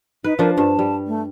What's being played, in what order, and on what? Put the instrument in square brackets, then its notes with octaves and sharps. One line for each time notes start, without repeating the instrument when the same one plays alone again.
[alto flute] D#4 [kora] B4
[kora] F3 D4 C5 [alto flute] A#4
[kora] G2 [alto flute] A5
[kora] G3
[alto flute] A3